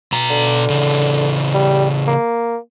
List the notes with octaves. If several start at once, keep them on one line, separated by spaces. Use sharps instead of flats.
B2 A#5
D3
C#3 E3
G3
A#3